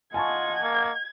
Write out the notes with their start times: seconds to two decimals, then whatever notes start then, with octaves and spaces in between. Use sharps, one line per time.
0.14 F4 D#5 F#5 G#5 A5 C#6 G#6
0.62 A#3